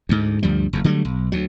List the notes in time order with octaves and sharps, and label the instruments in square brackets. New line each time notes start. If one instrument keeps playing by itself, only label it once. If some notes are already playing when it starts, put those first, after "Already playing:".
[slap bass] D2 G#2
D2 G2 F3 G3
F#1 E2
D3 F#3 G3 A3
B1
D2 F#3